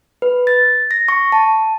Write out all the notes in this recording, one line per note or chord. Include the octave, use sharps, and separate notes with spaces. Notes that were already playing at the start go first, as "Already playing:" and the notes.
B4
A6
A#6
C#6
A5